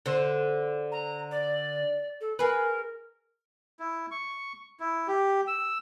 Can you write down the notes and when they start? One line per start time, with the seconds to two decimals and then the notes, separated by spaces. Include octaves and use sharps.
0.06 D3 C5
0.92 A#5
1.31 D5
2.21 A4
2.39 G#4 A#4 B4
3.80 E4
4.11 C#6
4.80 E4
5.08 G4
5.47 E6